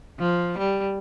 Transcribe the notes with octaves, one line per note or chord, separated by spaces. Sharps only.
F3
G3